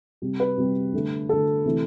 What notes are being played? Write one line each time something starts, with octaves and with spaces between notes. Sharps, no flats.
C3 G3
B4
C3 G3
D3 A3
D3 A3 A4
C3 E3 A3